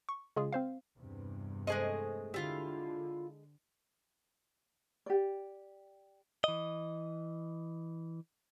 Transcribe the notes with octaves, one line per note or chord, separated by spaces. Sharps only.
C#6
C#3 G#3 F4 G#4
C4 C5 F5
E2 G2 C3
G#3 A3 G#4 A4 C5 D#5
D3 E4 F4 G4 F5
G4 D5
E3 D#5